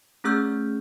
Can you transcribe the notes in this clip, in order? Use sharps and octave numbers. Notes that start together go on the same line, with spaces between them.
A3 C#4 G#4 E6 F6 G6